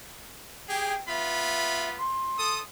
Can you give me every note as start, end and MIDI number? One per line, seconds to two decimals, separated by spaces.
0.69 0.95 67
0.69 0.95 68
0.69 0.95 79
1.08 2.05 59
1.08 2.05 65
1.08 1.89 76
1.08 2.05 83
1.97 2.54 84
2.39 2.61 69
2.39 2.61 87